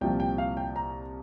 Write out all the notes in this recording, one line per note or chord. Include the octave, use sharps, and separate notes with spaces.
C2 A#2 F3 G5
G5
F5
G5
A#5